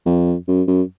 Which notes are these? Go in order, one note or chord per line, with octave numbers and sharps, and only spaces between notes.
F2
F#2
F#2